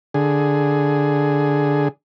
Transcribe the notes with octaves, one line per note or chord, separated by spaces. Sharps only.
D3 G#4